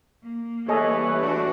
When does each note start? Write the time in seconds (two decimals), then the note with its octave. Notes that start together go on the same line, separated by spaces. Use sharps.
0.23 A#3
0.69 E3 G3 G#4 A4 B4 C#5 D#5
1.20 A3 D4 F#4